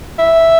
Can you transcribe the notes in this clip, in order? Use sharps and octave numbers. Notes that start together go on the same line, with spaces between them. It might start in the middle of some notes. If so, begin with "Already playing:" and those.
E5